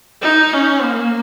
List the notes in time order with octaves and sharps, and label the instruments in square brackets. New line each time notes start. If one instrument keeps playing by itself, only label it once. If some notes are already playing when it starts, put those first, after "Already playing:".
[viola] D#4
C#4
A#3